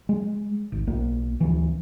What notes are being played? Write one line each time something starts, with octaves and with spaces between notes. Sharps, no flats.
G#3
G#1
B1 A#3
D1 E3